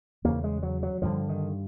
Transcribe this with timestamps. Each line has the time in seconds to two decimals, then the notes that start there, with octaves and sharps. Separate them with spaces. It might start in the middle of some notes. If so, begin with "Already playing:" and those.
0.24 E2 C#3 A#3
0.44 G#3
0.63 F#3
0.83 F#3
1.02 G2 D3 F3
1.29 D#3